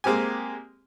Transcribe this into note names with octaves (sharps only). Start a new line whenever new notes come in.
G#3 A#3 C4 G4 G#5